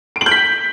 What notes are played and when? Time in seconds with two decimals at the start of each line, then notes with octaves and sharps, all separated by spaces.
0.16 D7
0.21 F#7
0.26 G6
0.31 B6